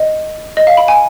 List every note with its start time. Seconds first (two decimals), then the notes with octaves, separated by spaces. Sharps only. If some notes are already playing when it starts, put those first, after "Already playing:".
Already playing: D#5
0.57 D#5
0.67 F5
0.77 B5
0.88 G#5